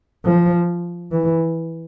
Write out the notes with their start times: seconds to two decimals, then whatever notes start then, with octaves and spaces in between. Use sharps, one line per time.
0.25 F3
1.11 E3